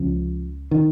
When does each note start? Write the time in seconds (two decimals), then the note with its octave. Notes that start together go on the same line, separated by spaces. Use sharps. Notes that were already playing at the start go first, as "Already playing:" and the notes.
Already playing: C#2 C#3 F3
0.71 D#3